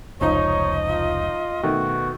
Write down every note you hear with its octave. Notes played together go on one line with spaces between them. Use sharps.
F1 C#2 F3 D#4 C#5 D#5
F4
B2 D#3 A3 F#4